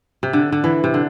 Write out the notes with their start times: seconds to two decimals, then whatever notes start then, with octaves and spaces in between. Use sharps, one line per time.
0.23 C3
0.33 D3
0.52 D3
0.64 E3
0.84 C3
0.94 D3